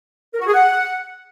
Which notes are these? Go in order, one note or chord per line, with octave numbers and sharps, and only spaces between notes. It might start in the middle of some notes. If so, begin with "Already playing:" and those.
A#4
F#4
G#4
F#5